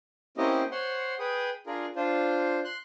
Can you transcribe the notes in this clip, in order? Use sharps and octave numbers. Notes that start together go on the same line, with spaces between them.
A#3 C4 C#4 E4 G4 D#5
C5 C#5 F#5 C6
G#4 B4 G5 D#6
D4 F4 G#4 A#4
D4 F4 C5
C6 F#6